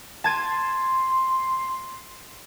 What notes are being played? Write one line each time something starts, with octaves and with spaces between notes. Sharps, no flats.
A5 C6 G#6 D#7